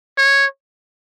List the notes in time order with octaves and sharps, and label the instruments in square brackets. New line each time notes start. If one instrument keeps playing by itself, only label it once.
[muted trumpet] C#5